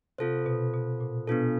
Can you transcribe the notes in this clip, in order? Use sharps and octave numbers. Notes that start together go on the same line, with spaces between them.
C3 C4 F4 A4 C5
B2
B2
A#2
B2 B3 D4 F4 A4